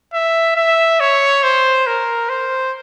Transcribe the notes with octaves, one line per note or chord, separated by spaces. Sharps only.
E5
E5
C#5
C5
A#4
C5